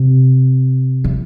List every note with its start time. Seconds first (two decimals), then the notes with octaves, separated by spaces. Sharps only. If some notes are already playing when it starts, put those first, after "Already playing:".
Already playing: C3
1.04 E3